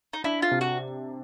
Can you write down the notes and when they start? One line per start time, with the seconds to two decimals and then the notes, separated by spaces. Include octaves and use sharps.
0.13 D#4
0.24 D4 E4
0.42 F4
0.51 C3
0.61 F#4